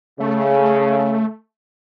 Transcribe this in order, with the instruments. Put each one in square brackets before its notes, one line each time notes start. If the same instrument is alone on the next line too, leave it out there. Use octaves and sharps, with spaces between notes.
[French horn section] C#3 [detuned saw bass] A3